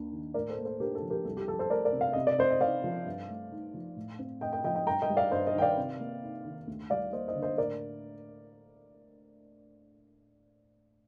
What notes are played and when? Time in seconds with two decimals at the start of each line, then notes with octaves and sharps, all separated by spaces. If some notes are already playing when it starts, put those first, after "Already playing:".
Already playing: D#2 A#3 D4
0.12 D#3
0.34 A2 A#4 D5
0.49 A4 C5
0.57 A#3
0.65 A4 C5
0.80 D4 G4 A#4
0.95 A4
1.02 F3
1.10 G4 A#4
1.25 C2 A4
1.37 G4
1.48 F3 A4
1.59 A4 C5
1.70 A3 A#4 D5
1.85 A#4 D5
1.93 C3
2.01 F5
2.13 C3 D#5
2.27 D5
2.39 C4 C5 D#5
2.50 D#5
2.61 D#4 D5 F5
2.84 F3
3.06 G2
3.28 A3
3.52 D#4
3.74 F3
3.96 A2
4.19 C4
4.41 A2 D#5 G5
4.52 D#5 G5
4.64 F3 D#5 G5
4.75 D#5 G5
4.87 G2 G5 A#5
5.02 D#5 G5
5.10 G3
5.17 D5 F5
5.32 G2 C5 D#5
5.47 C5 D#5
5.54 D#3 G5
5.62 D5 F5
5.77 C3
6.00 A#3
6.23 D#4
6.45 D#3
6.68 D2
6.90 G3 D5 F5
7.12 A#3 C5 D#5
7.28 C5 D#5
7.35 D3
7.42 C5 D#5
7.58 A2 A#4 D5